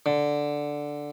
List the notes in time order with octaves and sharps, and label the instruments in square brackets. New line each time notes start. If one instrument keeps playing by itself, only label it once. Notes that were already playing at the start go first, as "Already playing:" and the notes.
[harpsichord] D3